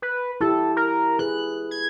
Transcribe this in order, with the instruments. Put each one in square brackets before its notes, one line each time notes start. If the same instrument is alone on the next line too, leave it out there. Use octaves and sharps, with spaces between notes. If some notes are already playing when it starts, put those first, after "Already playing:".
[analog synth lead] B4
[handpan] E4 G4 [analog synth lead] A4
[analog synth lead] A#4
[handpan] G#4 B4 [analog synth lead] F#6
[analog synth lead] G#6